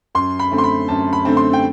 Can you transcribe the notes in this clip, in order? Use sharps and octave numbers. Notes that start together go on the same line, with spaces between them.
F#2 C6
B5
D3 A3 C4
C6
B5
F#2 A5
B5
D3 A3 C4
C6
G5